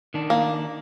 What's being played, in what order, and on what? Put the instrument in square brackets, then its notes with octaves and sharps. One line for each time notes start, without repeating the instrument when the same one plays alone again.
[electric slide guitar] D#3 D4
[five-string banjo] A#3